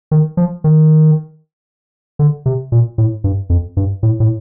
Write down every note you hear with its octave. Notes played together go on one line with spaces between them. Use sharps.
D#3
F3
D#3
D3
C3
A#2
A2
G2
F2
G2
A2
A2